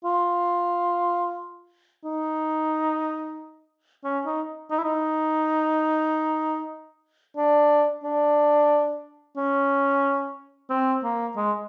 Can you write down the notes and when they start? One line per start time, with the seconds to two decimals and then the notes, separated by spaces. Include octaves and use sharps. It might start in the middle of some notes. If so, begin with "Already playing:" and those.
0.05 F4
2.04 D#4
4.04 C#4
4.26 D#4
4.71 D#4
4.78 E4
4.84 D#4
7.37 D4
8.04 D4
9.37 C#4
10.70 C4
11.04 A#3
11.37 G#3